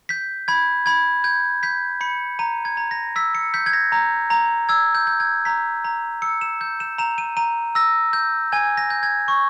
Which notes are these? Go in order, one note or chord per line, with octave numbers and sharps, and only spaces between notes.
G6 B6
B5 G#6
B5 G#6
G6 G#6
G6 B6
B5 C#7
A#5 D#7
G#6
A#5
A#6
E6 B6
C#7
G6 B6
G#6
A#6
A#5
A#5
E6 G#6
G6
G6
G#6
A#5 B6
A#5
E6 C#7
E7
G6
E7
A#5 E7
D#7
A#5 D#7
E6 A#6
G6
G#5 G#6
A#6
G6
G#6
C#6